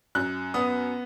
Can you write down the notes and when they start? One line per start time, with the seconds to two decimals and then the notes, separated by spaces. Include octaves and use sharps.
0.15 F#2 F#6
0.54 B3 D#6